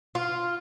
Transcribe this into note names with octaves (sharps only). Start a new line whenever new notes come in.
F4